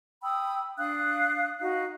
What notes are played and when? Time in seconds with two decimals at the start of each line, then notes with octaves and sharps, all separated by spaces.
0.22 G5 B5 D#6 E6
0.78 D4 F5 D#6 F#6
1.60 D#4 F#4 F5